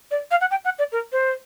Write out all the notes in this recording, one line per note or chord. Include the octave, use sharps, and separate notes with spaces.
D5
F5
F#5
G5
F#5
D5
A#4
C5